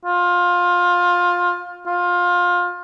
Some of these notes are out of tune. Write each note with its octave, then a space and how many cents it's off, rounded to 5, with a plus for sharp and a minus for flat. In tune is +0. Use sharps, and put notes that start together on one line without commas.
F4 +20
F4 +20